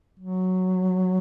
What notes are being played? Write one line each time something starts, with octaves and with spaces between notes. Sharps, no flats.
F#3